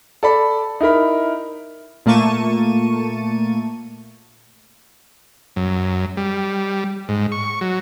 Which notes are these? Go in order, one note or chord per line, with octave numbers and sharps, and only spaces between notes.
A4 D5 B5
D#4 E4 A#4 B5
A#2 A3 A#3 A5 C#6 D#7
F#2
G3
G#2
C#6
F#3